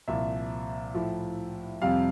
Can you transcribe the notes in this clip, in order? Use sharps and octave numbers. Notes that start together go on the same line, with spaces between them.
C2 A#2 F3 E5
A2 F3
F2 C3 G3 F5